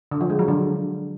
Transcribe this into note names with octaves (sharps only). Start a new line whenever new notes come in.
D3
F3
G#3
F#3
D3